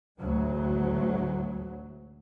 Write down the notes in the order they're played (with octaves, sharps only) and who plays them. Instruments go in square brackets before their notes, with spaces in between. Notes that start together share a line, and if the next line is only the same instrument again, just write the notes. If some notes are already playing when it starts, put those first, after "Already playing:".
[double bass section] A1 D2 F#3 G#3